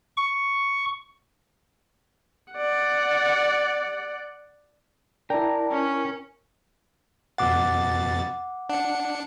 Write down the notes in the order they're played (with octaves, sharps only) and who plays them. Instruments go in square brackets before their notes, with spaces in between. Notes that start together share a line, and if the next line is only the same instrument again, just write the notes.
[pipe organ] C#6
[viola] D5 F#5
[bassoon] D4 [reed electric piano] E4 G5 [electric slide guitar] A#4
[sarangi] C#4
[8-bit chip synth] F2 B2 A6 [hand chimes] F#5 D6
[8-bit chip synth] D4 C#7 [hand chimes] F#5